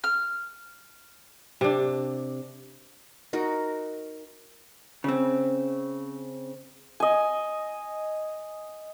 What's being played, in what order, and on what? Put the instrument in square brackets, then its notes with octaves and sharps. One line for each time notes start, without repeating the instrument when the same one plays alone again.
[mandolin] F6
[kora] C3 D4
[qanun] D#4 F#4 A#4
[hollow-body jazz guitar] C#3 C4
[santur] D#5 G#5